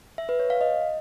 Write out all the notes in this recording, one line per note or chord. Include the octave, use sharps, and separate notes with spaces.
E5
B4
C#5
F5
D#5